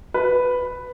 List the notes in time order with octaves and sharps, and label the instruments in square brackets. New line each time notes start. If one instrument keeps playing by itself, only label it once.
[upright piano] B4